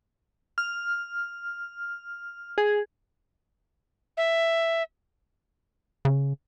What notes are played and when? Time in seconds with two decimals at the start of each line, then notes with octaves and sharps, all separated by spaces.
0.58 F6
2.58 G#4
4.17 E5
6.05 C#3